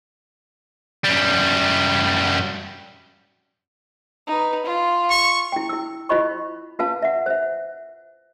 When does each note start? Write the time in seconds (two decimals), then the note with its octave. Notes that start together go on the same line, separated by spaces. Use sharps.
1.05 F#2 G3
4.27 D#4 B4
4.65 F4
5.10 C#6
5.52 E4 G5
5.69 E4 E6
6.09 E4 F4 C5 D#5 B5 C#6
6.79 F4 B4 F5 A5
7.02 E5 F#5
7.26 C5 E5